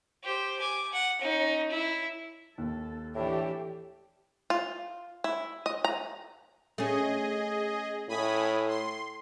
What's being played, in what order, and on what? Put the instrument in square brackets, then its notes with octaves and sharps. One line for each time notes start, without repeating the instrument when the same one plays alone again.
[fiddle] G4 C5
G#5 D6
F#5
C#4 D#4
E4
[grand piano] D#2 [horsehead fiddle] A4
[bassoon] A2 [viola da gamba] E3 D4 [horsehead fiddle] G4
[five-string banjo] F4
E4
D#5
A#5
[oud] A3 C#4 [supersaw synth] G#4 D#5
[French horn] A2 [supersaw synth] G#5 B5 D#6
[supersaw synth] C6